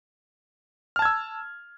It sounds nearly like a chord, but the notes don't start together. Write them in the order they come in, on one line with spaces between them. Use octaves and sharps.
F6 A5 G#6 E6